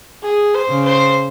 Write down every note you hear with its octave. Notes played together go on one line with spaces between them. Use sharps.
G#4
C5
C#3
C5